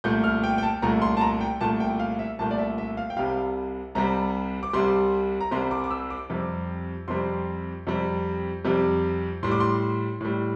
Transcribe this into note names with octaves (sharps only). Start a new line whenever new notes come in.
C2 A#2 A3 G6
F6
G5
G5
A5
C2 A#2 A3 A#5
C6
A5
A#5
G5
C2 A#2 A3 A5
G5
F5
E5
C2 A#2 A3 A5
D5
E5
E5
F5
G5
C2 C3 G3 F5
C2 C3 G3 A#5
D6
C2 C3 G3 C6
A#5
C2 C3 G3 C6
D6
D6
E6
D6
F2 C3 G3
F2 C3 G3 C6
F2 C3 G3
F2 C3 G3
A2 G3 C6
D6
C6
A2 G3